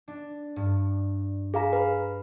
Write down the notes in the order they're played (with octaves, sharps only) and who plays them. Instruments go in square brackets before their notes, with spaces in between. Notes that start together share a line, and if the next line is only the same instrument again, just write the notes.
[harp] D4
G2
[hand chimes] G#4 F5 A#5
B4